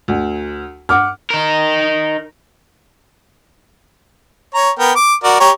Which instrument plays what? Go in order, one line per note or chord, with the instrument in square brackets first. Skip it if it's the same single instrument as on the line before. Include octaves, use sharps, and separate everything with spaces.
[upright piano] D2
F#5 D6 F6
[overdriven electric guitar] D#4 A#4
[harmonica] C#5 A#5
B3 A#4 G5
D6
F#4 A#4 D5
G4 C#5 A#5